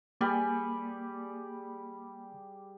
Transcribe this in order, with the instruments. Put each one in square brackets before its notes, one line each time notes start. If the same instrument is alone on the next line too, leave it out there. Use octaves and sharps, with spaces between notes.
[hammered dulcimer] G3 G#4 D5 [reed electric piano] A#3